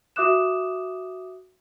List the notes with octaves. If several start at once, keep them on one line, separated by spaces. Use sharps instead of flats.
F#4 E5 D6 D#6 F#6 E7